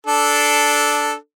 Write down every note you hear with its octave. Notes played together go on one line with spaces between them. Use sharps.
D4 A4